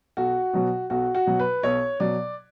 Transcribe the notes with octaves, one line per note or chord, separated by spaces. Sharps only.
B1 F#4
B2 F#3
B1 F#4
F#4
B2 F#3
B4
B1 C#5
B2 F#3 D5